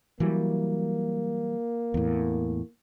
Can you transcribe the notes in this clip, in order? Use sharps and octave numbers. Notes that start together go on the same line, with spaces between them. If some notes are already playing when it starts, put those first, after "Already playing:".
E3 F#3 G3 A#3
E2 A2